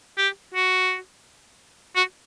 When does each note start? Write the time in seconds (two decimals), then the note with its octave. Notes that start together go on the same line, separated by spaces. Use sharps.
0.17 G4
0.54 F#4
1.96 F#4